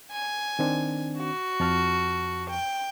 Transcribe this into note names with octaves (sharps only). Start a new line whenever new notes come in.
G#5
D#3 C4 D4
F#4
F2 A5 F6
G5